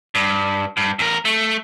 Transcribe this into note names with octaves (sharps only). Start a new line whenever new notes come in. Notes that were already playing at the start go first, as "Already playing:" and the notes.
G2
G2
E2 A#4
A3